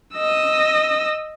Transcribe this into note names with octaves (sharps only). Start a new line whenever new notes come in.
D#5 E6